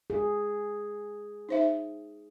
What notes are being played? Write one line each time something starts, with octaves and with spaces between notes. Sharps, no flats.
G#4
D#4 C5 E5